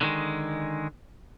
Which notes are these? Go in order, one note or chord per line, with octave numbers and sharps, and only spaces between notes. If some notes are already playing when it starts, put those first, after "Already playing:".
D3 D#3 G#3